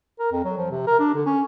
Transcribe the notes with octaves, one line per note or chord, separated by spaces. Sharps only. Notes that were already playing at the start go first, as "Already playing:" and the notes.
A#4
F2
F#3
F3
C3
A#4
D4
D3
C#4